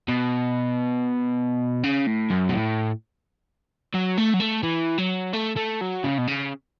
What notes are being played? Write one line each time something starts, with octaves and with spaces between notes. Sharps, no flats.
B2
C#3
A2
F#2
B2
A2
F#3
A3
F#3
A3
E3
F#3
A3
A3
F#3
C#3
B2
C#3